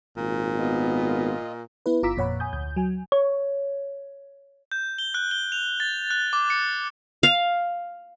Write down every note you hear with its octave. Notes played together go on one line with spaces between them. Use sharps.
G#1 A#2
B3 F4 D#5
B3 E4 B4
G1 F4 A#5 D6 E6 B6
F2 A#2 C#5 F#5 B5
G#5 D#6 G6
D2 G6
F#3 G#5
C#5
G6
G7
F#6
G7
F7
A6
F#6
D6
C#7
F5